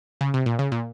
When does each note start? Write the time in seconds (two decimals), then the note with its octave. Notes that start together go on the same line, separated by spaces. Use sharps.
0.21 C#3
0.34 C3
0.46 A#2
0.59 C#3
0.72 A#2